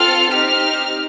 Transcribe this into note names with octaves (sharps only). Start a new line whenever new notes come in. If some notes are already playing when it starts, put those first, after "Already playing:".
Already playing: C4 F4 A4 F6
C4 D#4 G4 F6